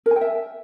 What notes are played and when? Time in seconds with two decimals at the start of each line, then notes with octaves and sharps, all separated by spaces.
0.06 A#4
0.11 G#5
0.16 G5
0.21 E5